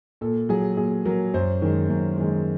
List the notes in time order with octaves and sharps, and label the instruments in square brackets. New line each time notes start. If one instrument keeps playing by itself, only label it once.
[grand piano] A#2 A4
F#3 G#4
A#2 G#4
F#3 A#4
F#2 C5
D#3 G#3
F#2
D#3 G#3